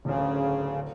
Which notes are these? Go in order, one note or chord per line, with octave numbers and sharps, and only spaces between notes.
D1 D2 C#3